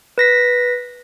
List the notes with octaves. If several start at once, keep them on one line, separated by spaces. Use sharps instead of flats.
B4 A#6 B6